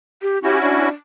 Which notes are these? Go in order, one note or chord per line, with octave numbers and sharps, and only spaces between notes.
G4
C#4 E4 F#4 G4
D4